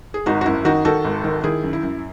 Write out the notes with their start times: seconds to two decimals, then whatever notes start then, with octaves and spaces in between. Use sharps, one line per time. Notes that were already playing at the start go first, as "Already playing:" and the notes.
0.14 G#4
0.26 G#1 D#4 F#4
0.41 F#4
0.46 F#2 E4
0.65 D#3 D#4 F#4
0.85 D#3 F#4 A4
1.05 G#1
1.24 D#3
1.44 D#3 E4 G#4
1.63 F#2
1.73 E4
1.83 F#2